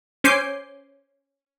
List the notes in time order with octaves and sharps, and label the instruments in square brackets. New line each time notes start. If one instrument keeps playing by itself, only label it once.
[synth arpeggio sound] C#4 C5 G#5 D6 G6 C7